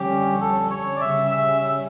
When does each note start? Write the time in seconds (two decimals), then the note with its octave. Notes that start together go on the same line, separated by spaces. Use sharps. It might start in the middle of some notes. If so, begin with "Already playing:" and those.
Already playing: F2 D3 G3 C#4 G4
0.40 A4
0.71 C#5
0.96 D5
1.01 C#3 G3 C#4 E5
1.31 E5
1.62 E5